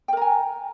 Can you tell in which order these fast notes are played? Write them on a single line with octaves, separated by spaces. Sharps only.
G5 A#4 A#5 G#5